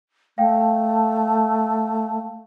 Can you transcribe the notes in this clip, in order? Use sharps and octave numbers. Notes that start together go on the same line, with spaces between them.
A3 F5 G5